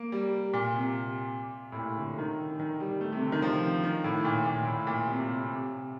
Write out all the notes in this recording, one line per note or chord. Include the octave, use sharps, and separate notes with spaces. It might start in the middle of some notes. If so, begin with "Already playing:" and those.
Already playing: A#3
G3
A#2
C3
A2
A#2
D3
D#3
D#3
G3
A3
C3
D3
D#3
F3
D#3
A2
A#2
A#2
A2
A#2
C3
C3
C3